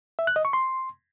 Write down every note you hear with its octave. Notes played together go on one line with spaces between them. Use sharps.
E5
F#6
D#5
C#6
C6